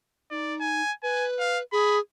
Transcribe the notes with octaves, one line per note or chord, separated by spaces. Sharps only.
D#4 D5
G#5
B4 G#5
F5
G#4 B5